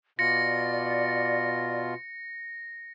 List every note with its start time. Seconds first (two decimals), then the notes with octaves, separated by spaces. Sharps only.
0.19 B2 F4 D5 A#6 C#7